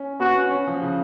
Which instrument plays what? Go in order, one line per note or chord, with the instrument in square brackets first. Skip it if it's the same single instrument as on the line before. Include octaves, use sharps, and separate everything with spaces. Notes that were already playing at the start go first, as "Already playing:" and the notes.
Already playing: [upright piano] C#4
[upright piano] B3 [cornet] F#4
[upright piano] C#4
C#4
F3
C#3